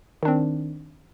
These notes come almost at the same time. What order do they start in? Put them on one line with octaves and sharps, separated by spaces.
D#3 D4 C4